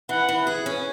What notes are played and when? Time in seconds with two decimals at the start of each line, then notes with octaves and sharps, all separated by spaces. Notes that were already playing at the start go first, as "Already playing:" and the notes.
0.09 E3 F#5
0.29 E3
0.47 G#4
0.66 C#4